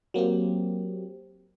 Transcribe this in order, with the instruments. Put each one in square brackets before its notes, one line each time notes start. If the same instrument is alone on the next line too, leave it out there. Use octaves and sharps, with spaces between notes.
[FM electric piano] F#3 A#3 C4 G4